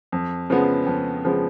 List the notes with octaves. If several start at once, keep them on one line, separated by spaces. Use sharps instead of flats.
F2
C#3 F3 G#3 B3
F2
C#3 F3 G#3 B3